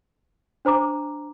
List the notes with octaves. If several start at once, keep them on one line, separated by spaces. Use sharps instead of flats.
D4 C5 A#5 D6